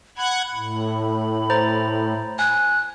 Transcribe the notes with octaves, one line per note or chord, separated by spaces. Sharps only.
F#5 B5 F#6 G#6
A2
C5 A#5 A6
G#5 F#6